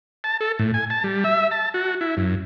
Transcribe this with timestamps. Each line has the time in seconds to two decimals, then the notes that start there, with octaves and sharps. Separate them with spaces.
0.24 A5
0.41 A4
0.59 A2
0.74 G#5
0.90 A5
1.04 G3
1.24 E5
1.51 A5
1.74 F#4
2.01 E4
2.17 F#2